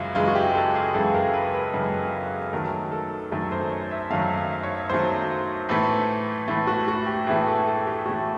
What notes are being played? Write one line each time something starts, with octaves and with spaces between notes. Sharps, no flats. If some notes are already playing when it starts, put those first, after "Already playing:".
Already playing: F#2 C#3 E3 G#3 F4 F#4
F#2 C#3 E3 G#3 F4
F#4
G4
A4
G#4
F#2 C#3 E3 G#3 A4
A#4
B4
B4
F#2 C#3 E3 G#3
F#2 D#3 F#3 A3 A#4
A4
F#2 D#3 F#3 A3 A4
C5
C#5
E5
F#2 D#3 F#3 A3 F5
F5
C#5
F#2 D#3 F#3 A3 C5
A2 E3 A3
A2 E3 A3
F#4
F#4
G4
A2 E3 A3 G#4
A4
A4
G4
A2 E3 A3 F#4